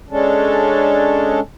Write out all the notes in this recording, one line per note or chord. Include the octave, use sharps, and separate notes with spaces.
G#3 C#4 D4 A4